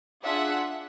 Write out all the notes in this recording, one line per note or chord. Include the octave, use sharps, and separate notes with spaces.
D4 F4 G#4 E5 F#5